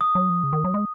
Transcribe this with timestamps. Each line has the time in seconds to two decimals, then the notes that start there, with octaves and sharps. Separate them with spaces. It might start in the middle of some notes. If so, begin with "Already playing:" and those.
0.01 D#6
0.15 F#3
0.29 F3
0.43 C#3
0.53 D#3
0.64 F#3
0.74 G#3